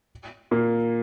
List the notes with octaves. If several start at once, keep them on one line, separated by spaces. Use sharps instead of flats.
A#2 A#3